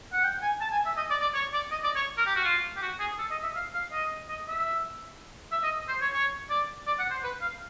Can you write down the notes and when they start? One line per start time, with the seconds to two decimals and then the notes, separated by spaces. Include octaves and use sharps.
0.13 F#5
0.23 G5
0.42 G#5
0.60 A5
0.72 G#5
0.85 E5
0.97 D#5
1.10 D5
1.21 D5
1.34 C#5
1.53 D5
1.71 D#5
1.84 D5
1.95 C#5
2.17 A#4
2.26 G4
2.36 F#4
2.44 F4
2.76 G4
2.82 F#4
2.99 G#4
3.18 A4
3.31 D#5
3.42 E5
3.56 F5
3.74 F5
3.92 D#5
4.28 D#5
4.48 E5
5.51 E5
5.63 D#5
5.88 C5
6.01 C#5
6.13 C#5
6.50 D5
6.87 D5
6.99 F#5
7.10 C5
7.23 B4
7.41 F5